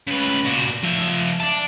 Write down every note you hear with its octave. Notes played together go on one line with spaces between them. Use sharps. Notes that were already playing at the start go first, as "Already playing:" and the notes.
C#3 B4
A#2 F#4
F3 E5
D5 A5